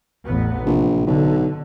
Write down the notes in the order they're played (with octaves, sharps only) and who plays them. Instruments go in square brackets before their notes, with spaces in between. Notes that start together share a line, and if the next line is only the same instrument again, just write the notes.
[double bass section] A1 E2 B3
[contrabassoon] A#1 [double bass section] C3
[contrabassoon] B1 [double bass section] D3